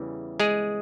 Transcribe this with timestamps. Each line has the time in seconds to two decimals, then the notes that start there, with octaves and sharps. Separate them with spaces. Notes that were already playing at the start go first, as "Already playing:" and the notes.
Already playing: E2 C#3 E3 G3
0.40 G#3 G#4